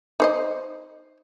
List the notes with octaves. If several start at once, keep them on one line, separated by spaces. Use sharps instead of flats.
D#4 C5 D#5